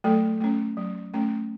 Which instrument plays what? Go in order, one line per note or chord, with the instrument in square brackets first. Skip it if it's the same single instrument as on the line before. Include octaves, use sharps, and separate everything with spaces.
[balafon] F#3 A3 A4
A3 C#4
F#3
A3 C#4